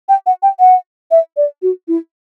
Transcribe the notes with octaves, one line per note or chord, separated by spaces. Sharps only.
G5
F#5
G5
F#5
E5
D5
F#4
E4